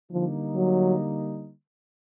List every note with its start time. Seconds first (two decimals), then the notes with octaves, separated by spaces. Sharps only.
0.12 D3 F3 G3 A#3 D#4
0.56 F#3